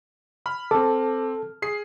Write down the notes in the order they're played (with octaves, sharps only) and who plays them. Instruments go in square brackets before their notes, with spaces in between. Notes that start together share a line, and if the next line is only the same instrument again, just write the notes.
[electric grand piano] B5 F6
[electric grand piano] C4 D6 [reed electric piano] A4
[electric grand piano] G#4 C7